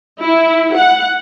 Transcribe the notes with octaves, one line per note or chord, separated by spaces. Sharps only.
E4
F#5